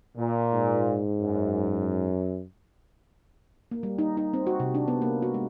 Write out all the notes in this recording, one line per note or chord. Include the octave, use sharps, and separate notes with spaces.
A#2
G#2
F#2
A#3
G3
D#4
D#4
C4
F#4
C3
D4
B3
A#3
F#4
G#3